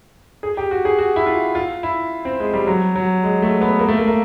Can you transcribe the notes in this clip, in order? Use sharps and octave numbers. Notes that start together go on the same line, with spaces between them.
G#4
G4
F#4
G#4
F#4
E4
F4
F4
E4
C4
G#3
G3
F#3
F#3
G#3
A3
B3
A#3
A3
A#3
A#3